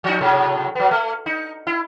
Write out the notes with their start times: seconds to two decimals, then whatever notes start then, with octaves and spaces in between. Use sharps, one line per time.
0.04 F3 D#4
0.21 A2 C3 F#3
0.75 F#3 B3
0.91 A3
1.26 D#4
1.67 E4